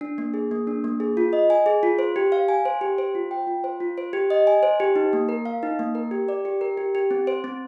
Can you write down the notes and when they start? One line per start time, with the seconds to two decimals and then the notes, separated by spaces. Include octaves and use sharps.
0.01 D4
0.18 A#3
0.34 G#4
0.51 A#3
0.67 D4
0.84 A#3
1.00 G#4
1.17 F4
1.33 D#5
1.50 G#5
1.66 G#4
1.83 F4
1.99 C5
2.16 G4
2.32 F5
2.49 G#5
2.65 C5
2.81 G4
2.98 C5
3.15 F4
3.31 G5
3.47 F4
3.64 C5
3.80 F4
3.98 C5
4.13 G4
4.30 D#5
4.47 G#5
4.63 C5
4.80 G4
4.96 D#4
5.13 A#3
5.29 A#4
5.45 F5
5.63 D#4
5.79 A#3
5.95 A#4
6.11 G4
6.28 D5
6.45 G4
6.61 A#4
6.77 G4
6.95 G4
7.11 C4
7.27 C5
7.44 C4